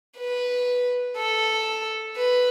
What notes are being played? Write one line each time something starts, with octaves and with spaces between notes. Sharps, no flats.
B4
A4
B4